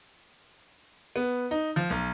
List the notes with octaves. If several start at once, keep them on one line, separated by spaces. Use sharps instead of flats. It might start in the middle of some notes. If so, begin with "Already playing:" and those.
B3
D#4
F3
B1